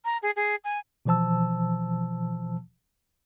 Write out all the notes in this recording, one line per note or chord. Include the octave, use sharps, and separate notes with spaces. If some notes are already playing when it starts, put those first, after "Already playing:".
A#5
G#4
G#4
G#5
B2 E3 F3 C5 A5 E6